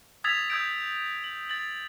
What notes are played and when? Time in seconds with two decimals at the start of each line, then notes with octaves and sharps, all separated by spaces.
0.24 D#6 E6 G#6 A6 B6 F7
0.50 D#6 E6 G6 G#6 D7
1.24 F#7
1.50 A6 F#7